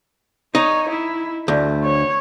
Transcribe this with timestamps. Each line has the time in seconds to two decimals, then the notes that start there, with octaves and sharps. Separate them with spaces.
0.55 D#4 C#5 D#5
0.89 E4
1.48 D2 A3
1.84 C#5